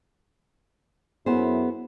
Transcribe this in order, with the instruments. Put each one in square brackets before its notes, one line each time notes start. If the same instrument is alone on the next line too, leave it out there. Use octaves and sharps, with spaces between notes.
[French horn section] F#2 E4 [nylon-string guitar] B3 G#4 C5